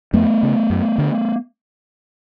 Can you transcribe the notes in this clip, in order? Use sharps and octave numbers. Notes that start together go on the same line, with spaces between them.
F2 A3 B3
C#3
F#2
D3